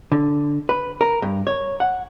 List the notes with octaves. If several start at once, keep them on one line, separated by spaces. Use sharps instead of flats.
D3
B4
A#4
G2
C#5
F#5